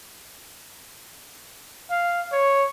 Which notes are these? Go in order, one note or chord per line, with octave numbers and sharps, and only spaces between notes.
F5
C#5